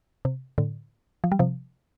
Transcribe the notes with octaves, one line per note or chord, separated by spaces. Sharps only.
C3
A2 D3
F3
G3
C3 F3